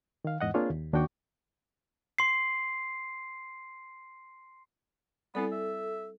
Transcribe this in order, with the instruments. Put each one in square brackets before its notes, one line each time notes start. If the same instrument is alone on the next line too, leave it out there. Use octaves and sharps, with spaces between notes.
[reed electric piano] D#3 F5
E2 G#2 D#5 F#5
A#3 C4 D4 F4 G#4 C#5
D#2
D#2 D4 F#4 G5 C#6 D6
[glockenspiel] C6 C7
[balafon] G3 C4 E4 [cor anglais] B3 [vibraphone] A4
[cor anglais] E5